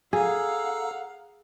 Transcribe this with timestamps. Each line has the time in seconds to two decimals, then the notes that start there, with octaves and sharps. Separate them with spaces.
0.13 G#4 A4 F5 F#5 A#5 E6